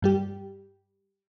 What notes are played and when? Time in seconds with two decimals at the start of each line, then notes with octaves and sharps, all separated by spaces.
0.02 G2 G3 G4